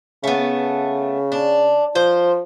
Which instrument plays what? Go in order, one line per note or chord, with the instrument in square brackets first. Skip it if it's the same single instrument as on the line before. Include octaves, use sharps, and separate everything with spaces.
[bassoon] C#3 [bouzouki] A3 B3
[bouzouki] D4
[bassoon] F3 [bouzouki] C5